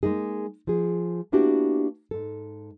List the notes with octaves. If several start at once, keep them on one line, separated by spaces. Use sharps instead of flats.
G#3 A#3 D#4 G#4
F3 G#4
A#3 B3 D4 E4 F#4 G4
G#2 A4